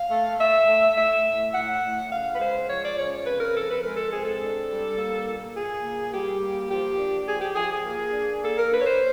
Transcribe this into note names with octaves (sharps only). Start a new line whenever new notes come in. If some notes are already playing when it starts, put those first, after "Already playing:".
Already playing: F5
A3
A3 E5
A3
A3 E5
A2
A2 F#5
A2
C#3 F5
B4
G#3 C5
F3 C#5
D5
C#3 C#5
C4 B4
A#4
F3 A4
B4
G#3 A#4
A4
C4 G#4
A4
D4
G3
A#3
A#2
A#2 G#4
A#3
G3 G4
A#3
F3 G4
D4
F3 G#4
G4
F3 G#4
G#4
A#3
D4
A#3 A4
A#4
D4 B4
C#5
C5